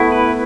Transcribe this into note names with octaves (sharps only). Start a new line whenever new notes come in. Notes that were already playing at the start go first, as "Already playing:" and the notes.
Already playing: A3 B3 E4
B4